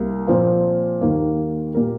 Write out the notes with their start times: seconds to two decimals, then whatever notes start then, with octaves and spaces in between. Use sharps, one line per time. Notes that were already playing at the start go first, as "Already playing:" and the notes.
Already playing: C2 A#3
0.27 A#2 F3 C4 F4
1.01 D#2 D#3 A#3
1.74 A#2 A#3 G4 A#4